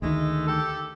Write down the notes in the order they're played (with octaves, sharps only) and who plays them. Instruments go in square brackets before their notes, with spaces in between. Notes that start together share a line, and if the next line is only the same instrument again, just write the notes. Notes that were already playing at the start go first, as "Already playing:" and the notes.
[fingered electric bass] D2 D#3 [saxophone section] G#3 A3
[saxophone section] G4 A4